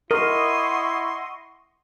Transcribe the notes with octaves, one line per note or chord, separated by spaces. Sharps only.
E4 A#4 D#5 F#5 C6 C#6